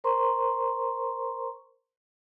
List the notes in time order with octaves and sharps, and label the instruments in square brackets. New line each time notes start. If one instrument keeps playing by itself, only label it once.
[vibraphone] A#4 C5 A#5 C6 C#6